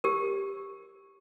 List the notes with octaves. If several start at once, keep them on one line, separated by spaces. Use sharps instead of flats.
G4 A#4